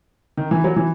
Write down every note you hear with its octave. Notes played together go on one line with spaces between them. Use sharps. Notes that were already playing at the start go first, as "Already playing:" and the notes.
D#3
E3
F#3
E3